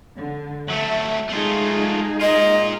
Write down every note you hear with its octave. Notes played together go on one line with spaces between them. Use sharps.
D3
F#3 A3 E5
G#3 A3 D#4 F4 G#4
F4 A#4 D#5